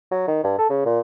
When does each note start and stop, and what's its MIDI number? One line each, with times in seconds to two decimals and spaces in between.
0.12 0.24 54
0.28 0.39 51
0.44 0.57 43
0.59 0.67 69
0.70 0.86 49
0.86 1.00 46